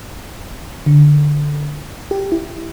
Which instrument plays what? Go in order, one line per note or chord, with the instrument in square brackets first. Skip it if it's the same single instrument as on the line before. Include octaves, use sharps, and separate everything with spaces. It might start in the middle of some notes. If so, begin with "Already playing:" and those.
[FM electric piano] D3
G4
E4